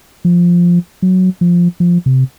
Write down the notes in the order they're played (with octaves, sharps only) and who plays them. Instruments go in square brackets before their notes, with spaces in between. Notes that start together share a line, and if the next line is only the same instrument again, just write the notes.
[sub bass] F3
F#3
F3
F3
C3